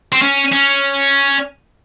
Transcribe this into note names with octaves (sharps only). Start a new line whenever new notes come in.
C4
C#4
C#4